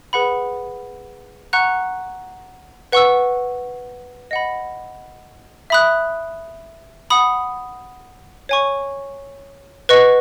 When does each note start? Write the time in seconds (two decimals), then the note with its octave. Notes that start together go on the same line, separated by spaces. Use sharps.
0.13 G#4 B4 F#5 B5
1.53 F#5 A#5 C#6 F#6
2.92 B4 F#5 C#6 E6
4.31 D#5 F#5 B5
5.70 E5 B5 D#6 F#6
7.10 F#5 B5 D#6
8.49 C#5 G#5 C#6
9.89 B4 D#5 F#5 C#6